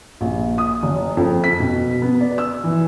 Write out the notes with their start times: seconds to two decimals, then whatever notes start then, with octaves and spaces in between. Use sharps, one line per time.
0.21 A#1
0.58 D#6
0.83 F#1
1.17 F2
1.44 B6
1.60 B2
2.02 B3
2.21 D5
2.38 E6
2.64 E3